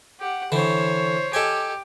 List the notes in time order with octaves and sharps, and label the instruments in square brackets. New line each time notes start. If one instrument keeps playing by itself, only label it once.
[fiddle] G4 F#5
[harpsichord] D3 E3 [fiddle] C5 C#5
[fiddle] G4 [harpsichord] A4 D#5 G#5